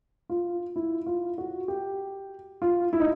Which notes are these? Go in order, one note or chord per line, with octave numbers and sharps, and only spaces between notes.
F4
E4
F4
F#4
G4
F4
E4
D#4